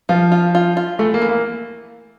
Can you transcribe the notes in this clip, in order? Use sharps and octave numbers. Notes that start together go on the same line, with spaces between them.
F3 F4
F4
F4
F4
E3 A3
A#3
E3
A#3